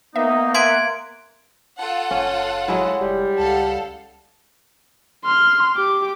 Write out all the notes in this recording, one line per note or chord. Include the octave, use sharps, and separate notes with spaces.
A#3 B3 D#4 E5
B3 E5 F#5 G#5 C6 G#6 D7
F4 A4 F#5
F#1 C#4
F#3 G#3 E4
F1 G3
C#2 A4 F5 F#5
C6 F6
G4 D6